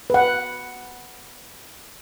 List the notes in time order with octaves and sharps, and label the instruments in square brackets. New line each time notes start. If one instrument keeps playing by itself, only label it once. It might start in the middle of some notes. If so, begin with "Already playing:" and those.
[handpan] B4 F#5